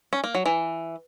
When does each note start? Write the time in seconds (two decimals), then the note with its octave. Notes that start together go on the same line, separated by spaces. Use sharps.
0.13 C#4
0.24 A#3
0.35 F#3
0.46 E3